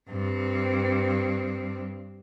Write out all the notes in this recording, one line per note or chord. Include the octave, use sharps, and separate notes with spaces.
G2 C4